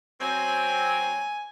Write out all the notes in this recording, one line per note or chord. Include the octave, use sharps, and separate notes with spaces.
F#3 C4 G#5